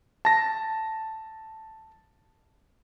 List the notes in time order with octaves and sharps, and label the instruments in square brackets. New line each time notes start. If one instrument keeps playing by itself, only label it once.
[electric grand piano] A5 A#6